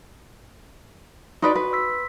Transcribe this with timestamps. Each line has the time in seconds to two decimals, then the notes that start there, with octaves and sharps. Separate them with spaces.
1.42 D#4 F#4 B4 D5 C6
1.55 B4
1.72 C6 E6 B6